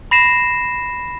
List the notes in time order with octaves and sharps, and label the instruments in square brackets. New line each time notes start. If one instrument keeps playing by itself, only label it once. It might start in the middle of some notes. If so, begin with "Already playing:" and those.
[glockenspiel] B5 A#6 C7 E7